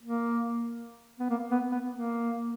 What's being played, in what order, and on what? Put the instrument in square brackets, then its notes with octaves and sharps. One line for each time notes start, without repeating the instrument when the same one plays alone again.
[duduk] A#3
B3
A#3
B3
B3
A#3